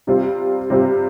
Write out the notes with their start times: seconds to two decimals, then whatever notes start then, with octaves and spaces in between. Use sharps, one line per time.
0.07 C3 G3 C4 F4
0.70 C3 G3 C4 F4